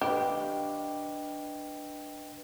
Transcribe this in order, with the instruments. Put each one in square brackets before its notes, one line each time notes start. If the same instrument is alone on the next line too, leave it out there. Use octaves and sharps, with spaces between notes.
[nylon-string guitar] D4 F5 [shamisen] G4 [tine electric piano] B4 D#5 G5